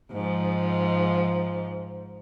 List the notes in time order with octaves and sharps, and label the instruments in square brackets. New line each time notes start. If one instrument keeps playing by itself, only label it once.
[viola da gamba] G#2 F3